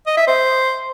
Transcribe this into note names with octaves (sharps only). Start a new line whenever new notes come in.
D#5
E5
C5